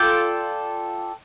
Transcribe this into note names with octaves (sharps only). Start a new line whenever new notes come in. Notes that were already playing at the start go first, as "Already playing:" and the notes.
Already playing: F4 A4 D5 G5